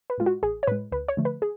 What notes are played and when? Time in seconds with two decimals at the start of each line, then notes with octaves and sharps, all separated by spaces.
0.10 B4
0.18 A2 G#3 F4
0.26 F#4
0.43 A1 G#4
0.63 C#5
0.67 A2 G#3 B4
0.92 D2 B4
1.08 C#5
1.17 D3 F3 A3
1.25 B4
1.42 G#4